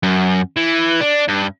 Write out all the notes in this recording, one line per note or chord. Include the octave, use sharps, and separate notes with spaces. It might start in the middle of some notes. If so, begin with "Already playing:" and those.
F#2
E3
D4
G2